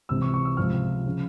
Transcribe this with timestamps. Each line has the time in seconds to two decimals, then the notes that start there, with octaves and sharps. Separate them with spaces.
0.09 C#2 C3 E3 E6
0.22 C#6
0.34 C#6
0.45 E6
0.57 C#2 C3 F3 F6
1.06 C#3 F3